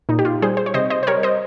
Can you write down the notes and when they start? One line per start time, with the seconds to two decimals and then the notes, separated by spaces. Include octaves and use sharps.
0.09 A#2 D#4
0.19 G4
0.25 F4
0.42 G3 G#4 C5
0.57 C5
0.66 C#5
0.74 C3 C5 D#5
0.90 C5 D#5
1.03 C5
1.07 G3 A#4 C#5
1.23 C5 D#5